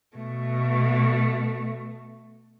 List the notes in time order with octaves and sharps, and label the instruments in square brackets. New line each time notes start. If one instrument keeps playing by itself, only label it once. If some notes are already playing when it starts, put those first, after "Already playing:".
[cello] B2 A3